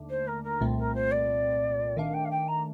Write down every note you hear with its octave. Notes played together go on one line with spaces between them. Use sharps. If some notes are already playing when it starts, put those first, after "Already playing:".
Already playing: D#2 D3 A3 D4
C5
A#4
A#4
C2 A#2 A3 C4
A#4
C5
D5
D#3 A3 D4 F5
G5
F5
G5
A#5